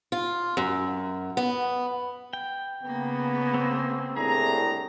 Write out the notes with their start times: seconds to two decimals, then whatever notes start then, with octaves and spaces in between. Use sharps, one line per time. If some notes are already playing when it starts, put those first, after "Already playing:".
0.12 F4
0.57 F#2
1.37 B3
2.33 G5
2.83 C#3 A#3 B3
3.54 C4
4.16 C2 A2 D4 G#4 A#5